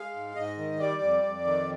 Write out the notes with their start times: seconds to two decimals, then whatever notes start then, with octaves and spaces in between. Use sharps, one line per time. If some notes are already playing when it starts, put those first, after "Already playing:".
Already playing: G#3 F5
0.14 G#2
0.36 G#2 D#5
0.58 D#3
0.79 G3 D5
1.02 F2
1.23 F2
1.45 D#3